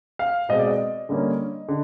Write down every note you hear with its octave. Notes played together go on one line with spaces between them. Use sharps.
F5
B2 G#3 C4 D#5
D5
D#5
D3 G3 A#3 C#4
D3